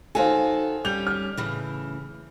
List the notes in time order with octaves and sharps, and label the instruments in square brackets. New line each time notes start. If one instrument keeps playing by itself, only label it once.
[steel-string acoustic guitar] D#3 F#4 A4 [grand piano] C5 F5 G#5
[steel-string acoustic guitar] G3 C#4 [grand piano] G6 F7
[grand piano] F6
[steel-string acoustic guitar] A2 C#3 E3